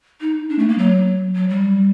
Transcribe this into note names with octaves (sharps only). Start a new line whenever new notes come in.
D#4
D4
A3
A#3
F#3
F#3
G3